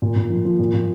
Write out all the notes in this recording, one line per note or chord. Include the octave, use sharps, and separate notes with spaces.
A#2
A#2
F3
F3
A#2
A#2